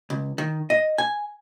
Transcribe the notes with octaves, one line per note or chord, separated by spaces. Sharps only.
C#2
D#3
D#5
G#5